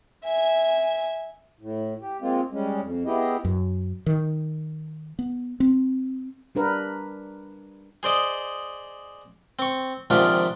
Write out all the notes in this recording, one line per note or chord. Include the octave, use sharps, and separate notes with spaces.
E5 G#5
A2
G4
G#3 A#3 C4 F4
G3 G#3 C#4
F2
B3 E4 G4 G#4 D#5
F#2
D#3
B3
C4
G3 D4 A#4 B4
G#4 C5 D5 D#5
C4 C#6
G#2 C3 D#3 F3 D4 F4